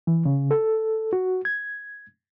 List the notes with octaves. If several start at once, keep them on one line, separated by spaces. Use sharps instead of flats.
E3
C#3
A4
F#4
G#6